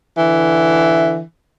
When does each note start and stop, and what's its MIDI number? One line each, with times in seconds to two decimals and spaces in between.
0.18 1.21 50
0.18 1.21 52